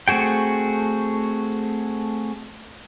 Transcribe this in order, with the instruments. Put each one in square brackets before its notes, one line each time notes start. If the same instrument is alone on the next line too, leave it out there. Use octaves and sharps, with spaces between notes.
[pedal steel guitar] A3 C4 F#4 G#4 G5